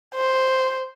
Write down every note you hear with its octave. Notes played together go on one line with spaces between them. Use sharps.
C5